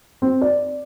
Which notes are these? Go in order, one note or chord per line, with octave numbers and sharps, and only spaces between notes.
C4
D5